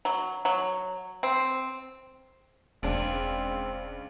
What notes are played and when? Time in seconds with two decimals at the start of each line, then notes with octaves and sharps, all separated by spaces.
0.05 F#3
0.45 F#3
1.23 C4
2.83 E1 C#2 C4 D4